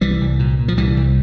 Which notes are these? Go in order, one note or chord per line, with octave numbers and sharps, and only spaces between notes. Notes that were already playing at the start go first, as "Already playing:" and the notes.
C2 E3 G3
C2
A#2
A#2
F3
C2 E3 G3
C2